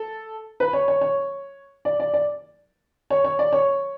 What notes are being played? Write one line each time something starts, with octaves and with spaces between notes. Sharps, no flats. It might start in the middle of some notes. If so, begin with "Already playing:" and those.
Already playing: A4
B4
C#5
C#5
C#5
D5
D5
D5
C#5
C#5
D5
C#5